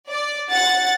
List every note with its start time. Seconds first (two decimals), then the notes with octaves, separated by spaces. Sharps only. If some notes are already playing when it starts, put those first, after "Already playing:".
0.11 D5
0.52 F#5 A6